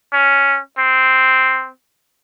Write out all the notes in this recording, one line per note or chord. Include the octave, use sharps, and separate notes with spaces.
C#4
C4